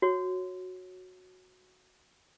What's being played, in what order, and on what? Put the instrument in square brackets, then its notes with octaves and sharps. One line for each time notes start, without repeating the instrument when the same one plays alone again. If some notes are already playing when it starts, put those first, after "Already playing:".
[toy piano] F#4 C#5